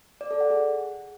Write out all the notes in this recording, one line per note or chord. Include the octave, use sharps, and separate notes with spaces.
D5
A4
F#5
G#4